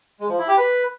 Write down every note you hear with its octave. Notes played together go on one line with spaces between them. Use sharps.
G#3
F3
E4
G4
B4